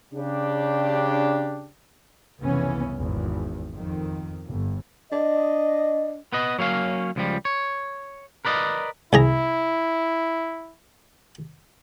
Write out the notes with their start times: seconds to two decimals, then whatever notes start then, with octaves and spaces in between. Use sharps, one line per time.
0.13 C#3 D4 G4
2.41 F1 C2 C#3 E3 B3 C#4
2.99 G#1 E2
3.72 F2 D#3
4.47 G1
5.12 D4 D#5
6.33 B3 B4 D#5
6.59 F#3 A#3 C#4 F5
7.16 C#2 F3 G3
7.45 C#5
8.45 A#4 B4 D5 D#5
9.13 C2 E4 G#4 A#5